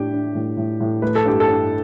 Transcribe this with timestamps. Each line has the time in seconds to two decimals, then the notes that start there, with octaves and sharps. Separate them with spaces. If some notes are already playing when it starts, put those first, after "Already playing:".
Already playing: A2 D4 G4
0.12 D4
0.35 A2
0.57 A2
0.80 A2
1.02 A3 B4
1.15 A4
1.25 G2 G4
1.40 A4
1.48 G2